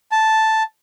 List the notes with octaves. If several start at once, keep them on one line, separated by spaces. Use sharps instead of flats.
A5